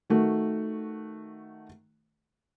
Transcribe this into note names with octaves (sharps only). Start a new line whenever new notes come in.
D#3 A3 F#4